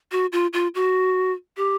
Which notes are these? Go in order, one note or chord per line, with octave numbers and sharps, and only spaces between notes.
F#4
F4
F4
F#4
G4